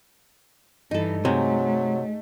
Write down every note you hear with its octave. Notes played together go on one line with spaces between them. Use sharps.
G2 E3 D#4 A4
C3 F#3 G#3 A3 D#4 C#5